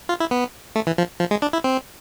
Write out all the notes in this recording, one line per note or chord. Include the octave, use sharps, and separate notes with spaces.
F4
E4
B3
A3
E3
F3
F3
G#3
D4
E4
C4